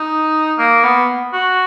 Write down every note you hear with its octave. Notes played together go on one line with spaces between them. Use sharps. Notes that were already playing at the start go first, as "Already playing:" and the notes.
Already playing: D#4
A#3
B3
F#4